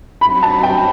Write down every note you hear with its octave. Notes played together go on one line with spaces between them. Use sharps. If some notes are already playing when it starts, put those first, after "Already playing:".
F#3 C4 D#4 F#4 B5
A5
G5